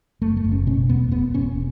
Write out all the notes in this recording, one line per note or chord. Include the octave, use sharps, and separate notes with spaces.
F#1 A3
A3
F#1
C#4
B2 C#4
E2 B3
E1 B3
E1 C#4